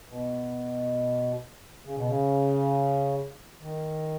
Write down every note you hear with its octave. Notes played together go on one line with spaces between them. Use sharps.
B2
C#3
B2
C#3
D#3